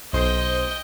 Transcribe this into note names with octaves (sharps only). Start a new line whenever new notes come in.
B1 C5 D#5 G5